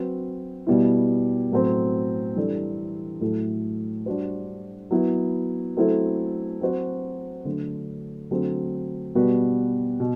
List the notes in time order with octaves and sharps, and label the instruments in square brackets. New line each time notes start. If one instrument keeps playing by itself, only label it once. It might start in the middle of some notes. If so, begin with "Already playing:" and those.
Already playing: [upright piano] F#3 C4 F#4 B4
B2 G3 B3 E4
A2 F#3 C4
E3 G3 D4 A4
A2 F#3 A3 E4 A4
G3 D4 F#4 C5
F#3 B3 E4 B4
F#3 A3 C4 E4 A4
F#3 C4 F#4 C5
D3 F#3 A3
D3 F#3 A3 C4
B2 G3 B3 F#4 B4
B2